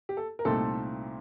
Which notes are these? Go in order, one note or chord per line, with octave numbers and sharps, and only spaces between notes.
G4
A4
A#4
C2 A#2 A3 C4 D#4 A4